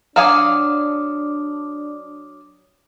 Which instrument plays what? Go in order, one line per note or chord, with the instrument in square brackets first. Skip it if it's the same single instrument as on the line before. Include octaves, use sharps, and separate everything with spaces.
[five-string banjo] F#3 F5 G#5 [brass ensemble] D4 [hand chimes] D6 D#6 F6